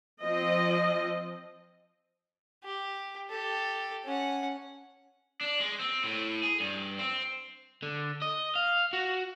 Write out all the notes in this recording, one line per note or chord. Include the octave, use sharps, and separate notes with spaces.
F3 C4 D#5
G4
G4 A4
C#4 F#5
D4
G#3
C4
A2
G#4
G2
C4
D3
D#5
F5
F#4